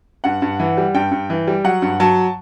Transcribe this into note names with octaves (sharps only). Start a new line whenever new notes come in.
G2 F#5
G2
E3
G3
G2 G5
G2
E3
G3
F#3 F#5
G2
F#3 A5